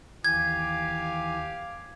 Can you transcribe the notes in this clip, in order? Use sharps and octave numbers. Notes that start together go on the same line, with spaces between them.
D#2 E3 G4 F5 G#5 D6 G#6